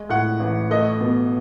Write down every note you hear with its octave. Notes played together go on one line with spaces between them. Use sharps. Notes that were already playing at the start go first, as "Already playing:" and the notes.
Already playing: G#3
A2 F#5
A1
A3 D#5
B2